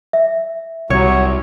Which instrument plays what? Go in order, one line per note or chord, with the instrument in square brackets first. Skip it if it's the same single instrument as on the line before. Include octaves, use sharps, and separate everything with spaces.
[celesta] E5
[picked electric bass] C2 [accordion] F#3 [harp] C#5